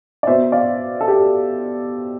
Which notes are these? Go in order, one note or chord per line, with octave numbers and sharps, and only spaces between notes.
D5
B2 C5 E5
D5 F5
A4
G4